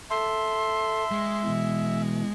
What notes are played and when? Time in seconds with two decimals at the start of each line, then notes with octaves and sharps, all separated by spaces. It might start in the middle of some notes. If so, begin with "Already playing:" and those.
0.10 A4 E5 C6
1.12 G#3
1.44 B2 E3